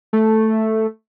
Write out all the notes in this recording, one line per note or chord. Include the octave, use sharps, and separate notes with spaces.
A3